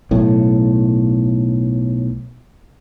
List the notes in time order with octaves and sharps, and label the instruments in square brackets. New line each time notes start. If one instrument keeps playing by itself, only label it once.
[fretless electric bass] B1 A2